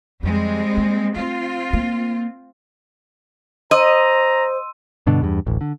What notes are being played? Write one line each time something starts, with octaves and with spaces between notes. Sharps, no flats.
F2 G3 G#3 C4
A#3
A3 C4 F4
A#3
C5 D#5 A#5 C6 E6 D#7
G2 B2 D3
E2 G2
D1 A1
D3